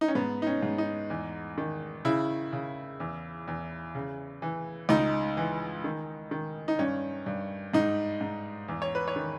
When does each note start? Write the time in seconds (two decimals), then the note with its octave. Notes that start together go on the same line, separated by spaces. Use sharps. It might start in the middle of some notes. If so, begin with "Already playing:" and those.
0.01 D#4
0.08 C#4
0.15 G#2 B3
0.42 D#4
0.47 C#4
0.63 G#2
0.78 D#4
1.10 E2
1.58 D#3
2.05 C#3 E4
2.53 C#3
3.00 E2
3.48 E2
3.95 C#3
4.42 E3
4.89 C#2 D#4
5.37 E3
5.84 D#3
6.31 D#3
6.68 D#4
6.79 G2 C#4
7.26 G2
7.74 G#2 D#4
8.21 G#2
8.68 E2
8.82 C#5
8.95 B4
9.08 C#5
9.16 D#3